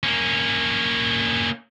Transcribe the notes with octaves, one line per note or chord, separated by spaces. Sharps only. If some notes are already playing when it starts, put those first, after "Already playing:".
A#3 C#4